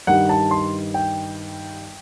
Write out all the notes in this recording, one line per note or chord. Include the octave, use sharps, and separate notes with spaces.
G2 D#3 G3 F#5
A5
C6
G5